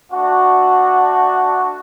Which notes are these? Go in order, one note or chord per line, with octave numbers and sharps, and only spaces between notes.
A3 D4 F#4